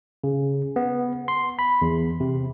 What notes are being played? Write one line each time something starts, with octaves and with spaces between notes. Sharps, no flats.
C#3
B3
C6
B5
E2
C3